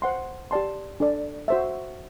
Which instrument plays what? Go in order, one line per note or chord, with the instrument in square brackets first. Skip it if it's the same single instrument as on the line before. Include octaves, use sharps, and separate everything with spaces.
[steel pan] C5 F#5 C6
G4 D5 A5 C6
D4 A4 D5
F#4 C5 E5